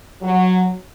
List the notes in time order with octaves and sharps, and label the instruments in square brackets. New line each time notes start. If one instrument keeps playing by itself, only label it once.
[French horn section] F#3